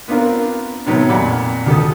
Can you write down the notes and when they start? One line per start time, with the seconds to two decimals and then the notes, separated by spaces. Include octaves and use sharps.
0.08 B3 C4 D4 F4 A#4
0.86 A2 C3 D#3 F#3 B3
1.09 F2 A#2 D5 F#5 B5
1.66 D2 G4 A4 D#6